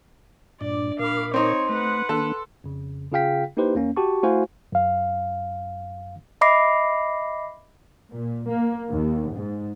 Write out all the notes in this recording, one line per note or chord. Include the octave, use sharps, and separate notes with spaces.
G2 A#2 D4 D5
A#2 A#4 F5 B5 D6
C4 D#4 C#5 C6
A3 B4 F#5
D#3 A#3 D4 A4
F2 C#3
C#3 F4 G#4 F5 G5 B6
A#3 D#4 E4 G4 B4 C5
E2 A#3 C#4
F#4 G4 A5 C#6
A3 E4 F#4 C5 F5 G#5
F#2 F5
D#5 E5 B5 D6 A#6 C7
A#2
A#3
D#2
G#2